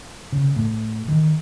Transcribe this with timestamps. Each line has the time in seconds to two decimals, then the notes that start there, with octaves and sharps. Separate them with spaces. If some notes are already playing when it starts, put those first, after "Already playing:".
0.32 C#3
0.56 A2
1.08 D#3